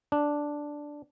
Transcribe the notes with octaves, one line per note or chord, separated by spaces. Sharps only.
D4